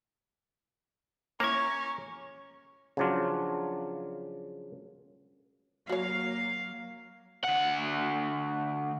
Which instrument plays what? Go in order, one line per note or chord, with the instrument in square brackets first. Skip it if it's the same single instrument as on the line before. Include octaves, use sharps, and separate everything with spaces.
[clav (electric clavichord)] A#3 E4 [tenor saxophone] C#4 [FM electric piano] A#5 G#6 [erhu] C#6
[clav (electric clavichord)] C#3 F3 F#3 D4 F4
[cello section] F#3 A#3 F5 [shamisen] F#4 C#5
[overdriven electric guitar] D2 F#5